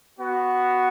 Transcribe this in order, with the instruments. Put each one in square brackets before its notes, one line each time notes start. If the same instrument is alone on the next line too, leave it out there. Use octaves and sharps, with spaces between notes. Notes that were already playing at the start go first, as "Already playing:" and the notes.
[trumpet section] B3 F#4